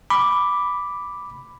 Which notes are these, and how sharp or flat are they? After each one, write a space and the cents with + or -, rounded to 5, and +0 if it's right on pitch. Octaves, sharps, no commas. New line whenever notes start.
B5 +0 D6 +0